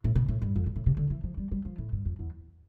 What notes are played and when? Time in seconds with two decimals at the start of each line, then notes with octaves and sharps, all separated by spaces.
0.04 A2
0.15 B2
0.28 A2
0.42 G2
0.56 F2
0.66 G2
0.76 A2
0.86 C3
0.97 D3
1.10 E3
1.23 F3
1.37 G3
1.51 G3
1.65 F3
1.78 A2
1.92 G2
2.05 F2
2.19 E2